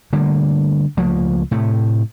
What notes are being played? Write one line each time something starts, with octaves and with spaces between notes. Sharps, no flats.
D3 G3 A3 A#3
C#2 F3 A3 A#3
A2 C3 A3